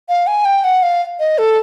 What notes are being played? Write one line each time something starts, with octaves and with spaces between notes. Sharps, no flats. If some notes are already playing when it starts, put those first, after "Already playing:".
F5
G#5
G5
F#5
F5
D#5
A4